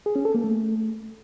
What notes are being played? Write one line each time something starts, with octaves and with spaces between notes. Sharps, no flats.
G#4
C#4
A4
A#3
A3